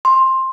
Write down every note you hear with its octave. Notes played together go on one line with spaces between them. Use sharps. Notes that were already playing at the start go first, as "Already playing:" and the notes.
C6